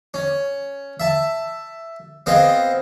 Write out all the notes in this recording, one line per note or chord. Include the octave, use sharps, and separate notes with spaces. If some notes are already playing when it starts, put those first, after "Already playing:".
C#4
E5 A5
B3 C4 G#4 D#5 F5 G5